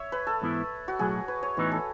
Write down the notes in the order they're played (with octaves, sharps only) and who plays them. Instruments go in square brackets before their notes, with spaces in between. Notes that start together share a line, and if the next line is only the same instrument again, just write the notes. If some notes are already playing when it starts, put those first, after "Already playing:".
Already playing: [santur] C#5 E5
B4
A4
[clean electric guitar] G#2 E3 B3 E4
[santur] F#4
[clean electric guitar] B1 A2 F#3 [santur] G#4
[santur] B4
C#5
[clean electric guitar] A2 E3 B3 D#4 [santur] B4
[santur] A4